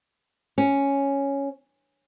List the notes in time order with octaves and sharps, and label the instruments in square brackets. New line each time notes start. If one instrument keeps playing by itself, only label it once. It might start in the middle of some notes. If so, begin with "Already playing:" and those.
[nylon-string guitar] C#4